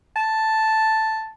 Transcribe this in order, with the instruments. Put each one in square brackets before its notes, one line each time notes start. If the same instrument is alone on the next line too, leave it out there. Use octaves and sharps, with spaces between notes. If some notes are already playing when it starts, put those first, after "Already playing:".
[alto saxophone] A5